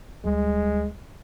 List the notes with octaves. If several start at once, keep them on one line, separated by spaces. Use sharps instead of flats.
D2 G3 G#3